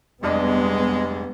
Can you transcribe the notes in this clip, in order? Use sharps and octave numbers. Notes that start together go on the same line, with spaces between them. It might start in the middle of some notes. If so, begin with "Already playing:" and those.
F1 G3 G#3 B3 D4 D#5